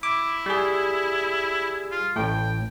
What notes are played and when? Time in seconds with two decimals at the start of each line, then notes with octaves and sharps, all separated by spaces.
0.03 E4 D6
0.46 G3 G#4
1.91 F4
2.16 A1 A2 G5